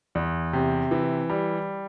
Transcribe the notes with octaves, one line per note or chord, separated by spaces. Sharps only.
E2
C3
E3
G3